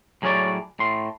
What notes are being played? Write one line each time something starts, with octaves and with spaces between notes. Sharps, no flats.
A2 F#3 G#4 A4 C#5 D5
A2 C6